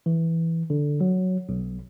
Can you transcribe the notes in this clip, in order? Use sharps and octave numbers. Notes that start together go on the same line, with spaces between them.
E3
D3
F#3
B1